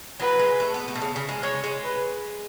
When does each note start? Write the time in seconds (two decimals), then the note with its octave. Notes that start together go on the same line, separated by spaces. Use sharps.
0.20 F#3 B4
0.39 G#3
0.60 A3
0.74 B3
0.88 A3
0.95 B2
1.02 C#3
1.16 C#3
1.29 G#3
1.43 G#3 C#5
1.64 G#3
1.84 B4